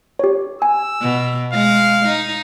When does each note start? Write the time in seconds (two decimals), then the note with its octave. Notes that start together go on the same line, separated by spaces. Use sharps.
0.19 G4 C#5
0.62 G#5 E6
1.02 B2
1.53 G#3 F5
2.05 D#4